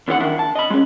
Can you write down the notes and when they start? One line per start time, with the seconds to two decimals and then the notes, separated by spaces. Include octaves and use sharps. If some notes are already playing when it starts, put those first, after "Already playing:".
0.08 D#2 E3 D#4 C5 F#5
0.20 D#3 D4 E4
0.39 A5
0.55 D#5 B5
0.70 G#3 C#4